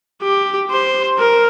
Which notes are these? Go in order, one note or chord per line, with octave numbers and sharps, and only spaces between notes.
G4
C5
A#4